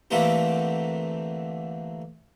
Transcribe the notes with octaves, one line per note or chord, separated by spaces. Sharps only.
D3 E3 A3 A#3 C4 G4